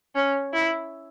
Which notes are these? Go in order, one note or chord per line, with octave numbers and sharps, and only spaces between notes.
C#4
E4